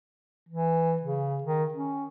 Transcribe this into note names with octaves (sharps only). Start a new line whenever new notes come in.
E3
C#3
D#3
C#4